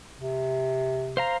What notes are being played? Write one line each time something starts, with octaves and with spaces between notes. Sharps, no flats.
C3
C5 F5 A#5